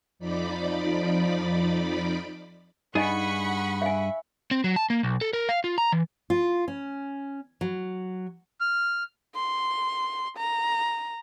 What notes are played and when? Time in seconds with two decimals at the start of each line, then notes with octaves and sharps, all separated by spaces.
0.19 F2 F3 D#4 D5 B5 D6
2.95 G2 D#4 G#4 D#5 F#5 G#5 B5 C#6
3.82 E5 F5 G#5
4.51 C4
4.64 F#3
4.76 A5
4.90 A#3
5.03 B1
5.21 A4
5.33 A#4
5.49 F5
5.64 F4
5.78 A#5
5.92 E3
6.30 F4
6.68 C#4
7.61 F#3
8.61 F6
9.36 C6
10.37 A#5